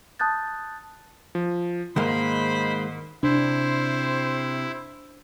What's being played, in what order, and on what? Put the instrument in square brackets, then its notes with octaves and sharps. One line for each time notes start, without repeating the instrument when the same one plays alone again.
[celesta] A5 D#6 F#6 G6 A6
[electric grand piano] F3
[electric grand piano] G#2 [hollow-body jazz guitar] D#3 G#3 A#3 [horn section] C5 D#5 B5
[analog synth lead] C3 [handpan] D4 [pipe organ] E4 [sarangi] C5